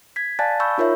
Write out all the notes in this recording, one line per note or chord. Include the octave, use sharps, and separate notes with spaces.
G#6 B6
D5 F5 G#5 A5 F#6 A6
B5 C#6 E6 G6
D#4 F4 A#4 C#5 E5